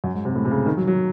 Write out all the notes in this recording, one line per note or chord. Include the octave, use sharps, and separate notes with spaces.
F#2
G#2
C3
A2
C3
C#3
D#3
F#3
F#3